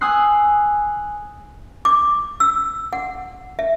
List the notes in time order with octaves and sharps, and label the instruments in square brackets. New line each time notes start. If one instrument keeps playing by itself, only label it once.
[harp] G#5 D#6 E6 F#6 C7
[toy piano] D6
E6
F#5
E5